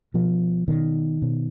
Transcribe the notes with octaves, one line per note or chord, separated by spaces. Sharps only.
B2 F3
B2 D#3
B2